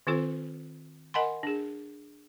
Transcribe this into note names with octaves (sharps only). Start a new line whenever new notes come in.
D#3 C4 F4 A4 C5
A#4 D#5 F#5 G#5 B5 C6
D4 G#4